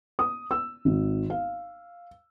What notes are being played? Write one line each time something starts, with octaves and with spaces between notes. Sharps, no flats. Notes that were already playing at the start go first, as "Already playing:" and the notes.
D#6
E6
G#1
F5